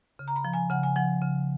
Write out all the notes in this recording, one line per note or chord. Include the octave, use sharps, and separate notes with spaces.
C#3
A#5
B5
F3
G#5
C#3 F#5
G#5
F3 F#5
C#3